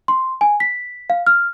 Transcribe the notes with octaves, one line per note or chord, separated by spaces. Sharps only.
C6
G#5
B6
F5
F6